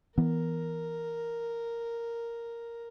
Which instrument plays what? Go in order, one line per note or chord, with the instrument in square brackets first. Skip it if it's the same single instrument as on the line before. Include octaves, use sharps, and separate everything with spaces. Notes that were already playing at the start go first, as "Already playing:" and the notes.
[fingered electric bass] E3 B3 [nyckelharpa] A#4